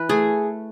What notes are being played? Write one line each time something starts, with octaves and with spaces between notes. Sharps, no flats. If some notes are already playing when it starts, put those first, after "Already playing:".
Already playing: E3 B4
A3 G#4